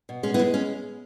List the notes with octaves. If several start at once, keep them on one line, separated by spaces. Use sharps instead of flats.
B2
G#3 C#4
B3 E4
G#3
C#4